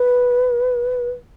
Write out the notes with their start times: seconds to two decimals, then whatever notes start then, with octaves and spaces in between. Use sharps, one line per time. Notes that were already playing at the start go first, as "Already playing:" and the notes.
Already playing: B4